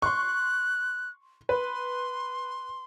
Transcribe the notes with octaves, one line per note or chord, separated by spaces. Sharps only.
C6 C#6 F#6
B4 C6